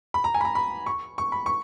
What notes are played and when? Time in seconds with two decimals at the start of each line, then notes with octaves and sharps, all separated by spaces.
0.14 B5
0.24 A#5
0.34 G#5
0.41 B5
0.45 A#5
0.55 B5
0.86 C#6
1.18 C#6
1.32 B5
1.46 C#6